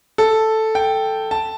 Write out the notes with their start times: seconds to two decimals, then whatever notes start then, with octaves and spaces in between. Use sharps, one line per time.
0.18 A4
0.75 G5
1.31 A5